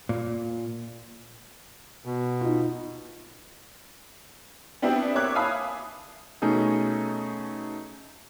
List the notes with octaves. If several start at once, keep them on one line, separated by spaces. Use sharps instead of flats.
A#2
B2
D#4 F4
B3 C4 D4 E4 G4
A#3 C#5 E5 D6 F#6 G#6
E5 F5 G#5 A5 B5 D#6
B2 A3 C#4 D#4 G#4 A4